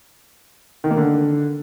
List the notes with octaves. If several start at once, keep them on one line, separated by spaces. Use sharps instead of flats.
D#3
A#3
D3